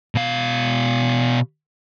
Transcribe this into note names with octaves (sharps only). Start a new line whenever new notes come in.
B2 F5